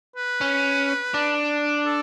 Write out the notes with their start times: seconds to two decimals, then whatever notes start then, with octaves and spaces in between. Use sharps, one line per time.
0.16 B4
0.41 C#4
1.14 D4
1.86 A4